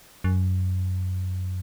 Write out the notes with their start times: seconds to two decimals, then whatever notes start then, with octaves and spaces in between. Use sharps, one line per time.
0.24 F#2